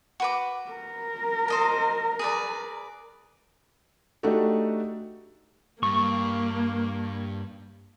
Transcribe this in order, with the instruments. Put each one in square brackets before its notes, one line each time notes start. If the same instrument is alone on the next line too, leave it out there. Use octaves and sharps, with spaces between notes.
[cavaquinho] F#4 B4 D6
[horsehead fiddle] A#4
[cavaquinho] C5 D#5 A5
G#4 B4 D5
[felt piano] A3 D4 D#4 F#4 G4 A4
[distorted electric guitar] G2 [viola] A#3 [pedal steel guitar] C#6